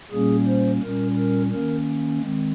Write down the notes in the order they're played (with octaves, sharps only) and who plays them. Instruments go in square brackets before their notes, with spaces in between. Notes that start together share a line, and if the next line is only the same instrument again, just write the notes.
[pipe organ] A#2 G3 A#3 C#4 G#4
C5
A#2 G3 C#4 A#4
A#4
D#3 A#3 C#4 A#4
D#3 G#3 C4